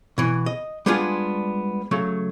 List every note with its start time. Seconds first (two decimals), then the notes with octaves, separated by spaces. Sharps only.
0.18 B2 E3
0.46 D#5
0.86 G3 G#3 B3 D4 F4 G#4
1.91 C#3 F#3 A3